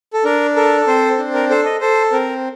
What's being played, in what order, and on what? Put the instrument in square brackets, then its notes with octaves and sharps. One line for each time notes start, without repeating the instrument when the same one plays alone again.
[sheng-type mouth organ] A4
D4 A#4
A4 A#4
C4 C5
D4
A#4
A4 C5
D#5
A4 C5
C4 A#4